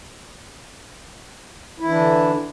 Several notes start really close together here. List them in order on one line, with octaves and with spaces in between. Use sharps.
E4 E3 D4 D3